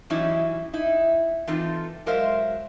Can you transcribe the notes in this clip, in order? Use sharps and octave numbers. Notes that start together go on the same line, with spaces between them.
E3 F#3 G3 C#4 D#4 E4
D#4 E4
E3 C4 D#4 F4 A4
F#3 G#3 A#4 C5 E5 F5